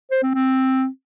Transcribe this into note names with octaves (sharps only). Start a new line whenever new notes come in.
C5
C4
C4